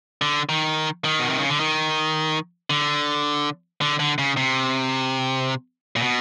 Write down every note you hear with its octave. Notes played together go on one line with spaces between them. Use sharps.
D3
D#3
D#3
B2
C3
C#3
D3
D#3
D3
D3
D3
C#3
C3
A#2
B2